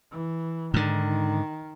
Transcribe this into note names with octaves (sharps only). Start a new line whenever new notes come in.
E3
G#2 D3 D#3